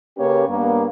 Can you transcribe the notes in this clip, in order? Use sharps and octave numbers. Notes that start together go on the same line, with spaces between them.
C#3 A#3 C#4 G4 B4 C#5
G2 A#3 B3